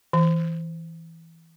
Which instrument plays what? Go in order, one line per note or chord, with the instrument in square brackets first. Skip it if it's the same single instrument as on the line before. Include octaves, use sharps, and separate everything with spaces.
[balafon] E3